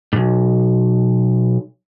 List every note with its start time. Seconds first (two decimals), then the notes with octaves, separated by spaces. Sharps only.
0.13 B1 G#2